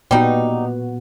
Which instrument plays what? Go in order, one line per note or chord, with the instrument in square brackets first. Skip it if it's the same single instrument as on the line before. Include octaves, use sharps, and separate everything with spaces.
[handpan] A#2 B3 F#4 [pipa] G3 D#4